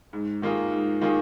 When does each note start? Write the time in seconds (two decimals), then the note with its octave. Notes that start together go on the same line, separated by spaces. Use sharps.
0.13 G#2
0.42 D#3 A#3 F4 G#4
0.72 G#2
1.01 D#3 A#3 F4 G#4